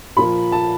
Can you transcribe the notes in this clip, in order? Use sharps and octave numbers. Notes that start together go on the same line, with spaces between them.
A#2 F3 A#3 B5
A5